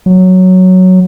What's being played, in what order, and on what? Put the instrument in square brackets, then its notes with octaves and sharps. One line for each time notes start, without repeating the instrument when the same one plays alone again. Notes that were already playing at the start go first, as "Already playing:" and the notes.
[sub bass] F#3